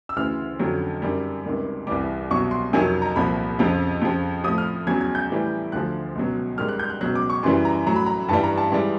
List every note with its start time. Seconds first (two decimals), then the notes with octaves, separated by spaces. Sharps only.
0.09 E6
0.16 D2 C#3 E3 F6
0.59 F2 D3 F#3
1.02 F#2 D#3 G3
1.45 C#2 C3 D#3 G3
1.87 C2 C3 E3 G3 D6
2.30 C2 B2 F#3 C#6
2.51 C6
2.73 F2 C3 D#3 F#3 G#5
3.02 A#5
3.16 C2 A#2 F3 B5
3.59 F2 C#3 F3
4.02 F2 C#3 F3
4.44 F3 D#6
4.48 A2
4.58 F6
4.87 E2 C#3 F#3 G#6
5.01 G#6
5.15 G6
5.29 A2 E3 G3
5.72 D2 D3 F3 F#6
6.15 C#2 B2 F#3
6.58 G#2 D#3 G3 F6
6.68 F#6
6.79 G6
6.90 F#6
7.01 C#2 B2 F#3 F#6
7.15 D6
7.30 C#6
7.43 F#2 C#3 E3 G3 C6
7.65 A#5
7.86 A2 F#3 A#5
7.96 B5
8.06 A#5
8.28 G2 E3 G3 A5
8.43 A#5
8.57 A5
8.72 G#2 E3 G3